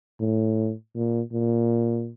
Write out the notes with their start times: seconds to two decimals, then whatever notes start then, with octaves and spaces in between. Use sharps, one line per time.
0.20 A2
0.95 A#2
1.33 A#2